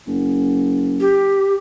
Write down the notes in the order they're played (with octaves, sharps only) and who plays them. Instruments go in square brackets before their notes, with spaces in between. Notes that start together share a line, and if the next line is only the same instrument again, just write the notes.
[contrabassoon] F#1
[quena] G4